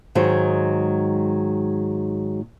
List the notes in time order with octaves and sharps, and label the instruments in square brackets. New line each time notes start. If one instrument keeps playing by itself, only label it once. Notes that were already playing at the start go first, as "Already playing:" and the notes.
[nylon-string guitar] G#2 D#3 F#3 G#3